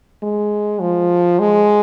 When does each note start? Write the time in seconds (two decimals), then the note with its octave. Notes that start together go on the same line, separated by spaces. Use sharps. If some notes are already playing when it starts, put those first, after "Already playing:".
0.23 G#3
0.81 F3
1.40 G#3